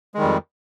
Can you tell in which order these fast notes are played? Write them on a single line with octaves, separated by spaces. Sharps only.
G#3 D#3 G3 F2